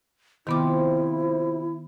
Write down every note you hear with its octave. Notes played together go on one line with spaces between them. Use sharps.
C3 D#3 F3 B3 E4 D6